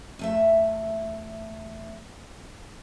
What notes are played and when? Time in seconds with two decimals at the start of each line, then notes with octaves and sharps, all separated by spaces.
0.19 E2 A3 E5